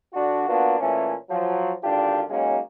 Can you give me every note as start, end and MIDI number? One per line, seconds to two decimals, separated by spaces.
0.13 0.45 50
0.13 0.45 62
0.13 0.45 66
0.46 0.78 58
0.46 0.78 59
0.46 0.78 62
0.46 0.78 65
0.46 0.78 66
0.80 1.13 46
0.80 1.13 52
0.80 1.13 57
0.80 1.13 61
1.29 1.72 53
1.29 1.72 54
1.83 2.22 32
1.83 2.22 50
1.83 2.22 62
1.83 2.22 65
1.83 2.22 67
2.29 2.59 54
2.29 2.59 56
2.29 2.59 58
2.29 2.59 61
2.29 2.59 63